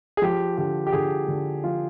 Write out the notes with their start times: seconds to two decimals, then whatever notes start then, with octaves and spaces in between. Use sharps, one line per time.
0.17 G#4
0.22 F3 G4
0.58 D3 G4
0.87 G4
0.93 D3 G#4
1.28 D3
1.64 F3 F4